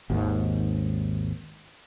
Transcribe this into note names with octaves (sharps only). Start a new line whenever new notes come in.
G#1 D#2 G#2